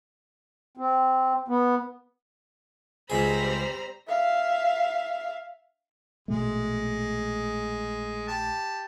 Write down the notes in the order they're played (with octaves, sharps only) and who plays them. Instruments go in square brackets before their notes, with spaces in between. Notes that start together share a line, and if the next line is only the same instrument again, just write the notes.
[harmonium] C4
B3
[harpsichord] C#2 G#4 [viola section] G3 C4 B5 [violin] C5 A#5
[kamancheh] E5 F5
[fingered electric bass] A#1 B2 A3 [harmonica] G#3
[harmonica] G4 A5